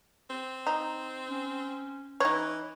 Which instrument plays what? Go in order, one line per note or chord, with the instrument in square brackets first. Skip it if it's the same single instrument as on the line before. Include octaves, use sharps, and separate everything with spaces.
[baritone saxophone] C4
[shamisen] D#4
[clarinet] C#4
[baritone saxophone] E3 [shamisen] D#4 C#5